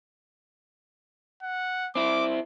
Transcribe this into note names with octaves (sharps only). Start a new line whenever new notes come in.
F#5
C4 E4 D6